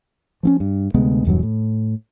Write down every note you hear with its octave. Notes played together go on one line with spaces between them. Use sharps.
F3 C4 C#4
G2
D2 C3 G#3 B3
E1 E2 G2 F#3
A2